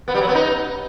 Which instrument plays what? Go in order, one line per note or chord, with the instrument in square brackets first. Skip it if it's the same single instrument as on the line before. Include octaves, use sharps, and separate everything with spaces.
[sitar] B3
G3
F#3
B3
D#4